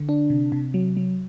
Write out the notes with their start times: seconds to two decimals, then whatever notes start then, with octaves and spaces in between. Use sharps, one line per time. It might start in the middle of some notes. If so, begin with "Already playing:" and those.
Already playing: D3
0.09 D4
0.30 C3
0.52 C3
0.74 F#3
0.97 F#3